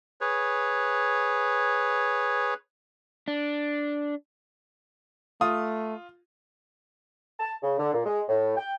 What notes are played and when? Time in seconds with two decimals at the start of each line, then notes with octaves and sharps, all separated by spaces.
0.21 G#4 B4 C#5
3.28 D4
5.41 A3 F4 D#6
7.40 A5
7.63 C#3
7.79 D3
7.93 A#2
8.06 G#3
8.28 A2
8.57 G5